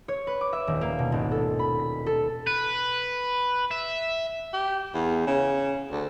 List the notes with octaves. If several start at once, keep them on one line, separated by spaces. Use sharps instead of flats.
C#5
B4
D6
E5
D#1
A#3
B2
G#1
A4
B5
B6
A4
B4
E5
G4
E2
C#3
D2